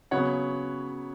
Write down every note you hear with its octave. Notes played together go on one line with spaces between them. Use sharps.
C#3 F#3 B3 C#5 F#5